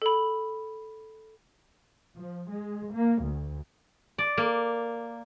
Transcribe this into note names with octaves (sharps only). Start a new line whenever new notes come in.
A4 B5
F3
G#3
A#3
D2
D5
A#3